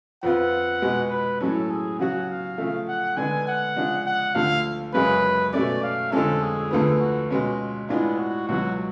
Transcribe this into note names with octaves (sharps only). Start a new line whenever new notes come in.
F2 F3 B3 F4 F#5
B2 G#3 B3
B4
A2 F#3 C#4 A4
G#4
C#3 F#3 C#4 F#4 F#5
F5
C#3 F3 A3
F#5
D3 G#3 B3 D4 G#5
F#5
C#3 F3 G#3 D4
F#5
D2 D3 F3 F5
F#2 C#3 G#3 C#4 G#4 B4
B2 A3 C#4 D5
F5
F2 D3 F3 G#3 C#4 A4
G#4
D2 D3 F3 B3
F#4
B2 G#3 C#4 F4
A2 G#3 B3 D4 F4
F#4
C#2 B2 F#3 F#4